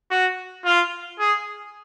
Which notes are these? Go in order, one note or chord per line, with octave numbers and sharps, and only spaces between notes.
F#4
F4
G#4